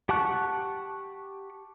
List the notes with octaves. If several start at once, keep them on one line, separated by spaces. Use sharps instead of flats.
G4 F#5 A5 C#6 F#6